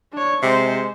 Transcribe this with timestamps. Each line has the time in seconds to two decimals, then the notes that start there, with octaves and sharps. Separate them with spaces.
0.13 D4 C#5
0.42 C3 G#3 C5